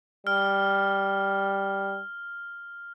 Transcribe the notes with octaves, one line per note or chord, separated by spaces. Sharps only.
G3 F6